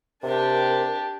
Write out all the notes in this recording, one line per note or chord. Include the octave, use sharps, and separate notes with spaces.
C3 D4 G4 A#4